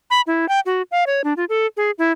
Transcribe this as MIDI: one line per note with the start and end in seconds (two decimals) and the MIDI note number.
0.10 0.21 83
0.27 0.48 64
0.49 0.60 79
0.66 0.82 66
0.91 1.04 77
1.07 1.22 73
1.24 1.33 62
1.37 1.45 65
1.49 1.66 69
1.77 1.91 68
1.98 2.12 64